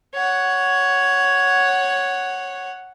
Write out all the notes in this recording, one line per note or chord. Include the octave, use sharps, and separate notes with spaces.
C#5 F#5